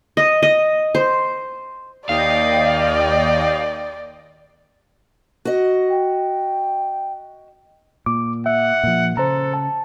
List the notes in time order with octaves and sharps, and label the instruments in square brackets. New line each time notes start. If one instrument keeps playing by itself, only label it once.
[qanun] D#5
D#5
C5
[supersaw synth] D#2 D#5 G5 [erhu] D5 [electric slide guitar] F5
[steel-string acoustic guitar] F#4 D#5
[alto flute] G5
[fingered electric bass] A#2 [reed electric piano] D6
[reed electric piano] E5 [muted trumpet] F#5
[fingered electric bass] A#2 F3
[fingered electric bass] C#3 [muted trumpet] A4 [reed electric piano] C5 A#5
[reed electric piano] A5